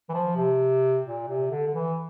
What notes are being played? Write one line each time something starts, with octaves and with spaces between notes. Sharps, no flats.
E3
F3
C3
A#2
C3
D3
D3
E3